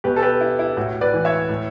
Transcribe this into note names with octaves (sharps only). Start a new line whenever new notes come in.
B2 G4 B4
A4
G4 B4
E4
E4
A2 F#4
B4 D5
E3
C#5 E5
A2